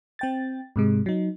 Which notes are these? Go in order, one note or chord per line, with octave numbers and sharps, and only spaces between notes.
C4 G5 A6
G#2 C3 G#3
F#3 D#4